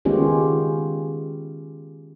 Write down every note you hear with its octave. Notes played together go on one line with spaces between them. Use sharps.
D#3 G#3 B3 C#4 F4 G4